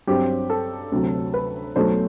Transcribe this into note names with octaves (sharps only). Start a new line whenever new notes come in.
G2 F#3 C4 G4
A4
D2 C3 F#3
B4
B1 B2 F#3 A3 C5